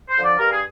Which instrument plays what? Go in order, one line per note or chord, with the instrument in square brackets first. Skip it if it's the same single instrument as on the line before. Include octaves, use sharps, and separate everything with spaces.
[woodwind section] C5
D3 F3
D5
G2 A#4
G#4